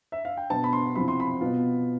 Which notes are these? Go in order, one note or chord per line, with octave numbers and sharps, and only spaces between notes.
E5
F5
G5
B2 B3 D4 A5
B5
C6
C3 F3 C4 E4 B5
C6
B5
B2 B3 F4